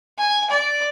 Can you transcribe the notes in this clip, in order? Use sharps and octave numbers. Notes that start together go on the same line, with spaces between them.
G#5
D5